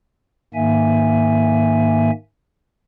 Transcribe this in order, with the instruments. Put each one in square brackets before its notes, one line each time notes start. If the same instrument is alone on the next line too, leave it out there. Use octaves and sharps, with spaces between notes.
[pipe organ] G#2 D#3 A#3 E5 G#5